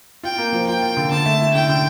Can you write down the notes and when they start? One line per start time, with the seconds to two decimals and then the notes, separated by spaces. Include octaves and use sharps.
0.23 F4 G5
0.38 A#3
0.53 F3
0.67 F4 G5
0.82 F4
0.97 D3
1.11 D3 A5
1.26 A3
1.40 E4
1.54 D3 G5
1.69 D3